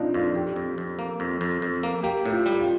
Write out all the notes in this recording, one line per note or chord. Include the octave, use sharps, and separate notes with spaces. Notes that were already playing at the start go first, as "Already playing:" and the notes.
Already playing: A#3 C4 D4 D#4 F4
F2 F4
F2 G4
F2
F2
A#3
F2
F2
F2
A#3
A#3 G4
A2
F4
G3
F4